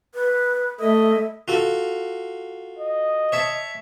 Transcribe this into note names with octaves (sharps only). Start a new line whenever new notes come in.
B4
A3 D#5 E5
F4 F#4 A4
D#5
C#5 E5 A5